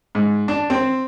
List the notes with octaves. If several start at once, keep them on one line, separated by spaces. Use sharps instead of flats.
G#2
D4
C4